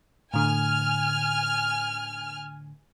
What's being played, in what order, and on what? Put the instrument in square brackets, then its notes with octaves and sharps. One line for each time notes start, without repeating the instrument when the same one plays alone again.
[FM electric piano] A2 D3 [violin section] G#5 F6